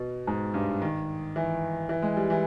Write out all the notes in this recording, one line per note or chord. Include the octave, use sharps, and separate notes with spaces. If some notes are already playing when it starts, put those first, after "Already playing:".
Already playing: B2
G#2
G2
D#3
E3
E3
G#3
G3
E3